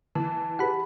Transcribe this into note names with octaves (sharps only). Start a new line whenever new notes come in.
E3 A5
G4 G#4 B4 F#5 B5